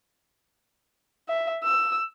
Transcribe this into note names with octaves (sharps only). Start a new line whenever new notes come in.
E5
E6